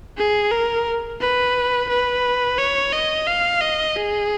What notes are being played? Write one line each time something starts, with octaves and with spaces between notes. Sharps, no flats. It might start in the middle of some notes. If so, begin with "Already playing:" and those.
G#4
A#4
B4
B4
C#5
D#5
F5
D#5
G#4